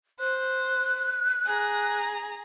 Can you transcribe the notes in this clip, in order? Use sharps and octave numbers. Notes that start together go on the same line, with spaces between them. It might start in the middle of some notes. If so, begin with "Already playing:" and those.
C5 F#6
G#4 A#5